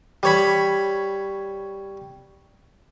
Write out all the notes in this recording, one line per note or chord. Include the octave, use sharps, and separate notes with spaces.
G3 C#5 B5